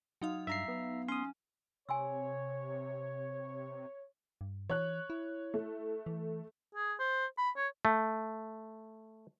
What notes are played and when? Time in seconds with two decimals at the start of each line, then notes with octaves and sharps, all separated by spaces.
0.22 F#3 D#4 F5
0.47 G2 E5 A#5 C7
0.68 B3
1.08 C#4 C6 D#6
1.89 C3 C#5 G#5 C6 E6
4.41 G2
4.70 E3 C#5 F#6
5.10 E4
5.54 A3
6.06 E3
6.75 G#4
6.99 C5
7.38 B5
7.57 C#5
7.85 A3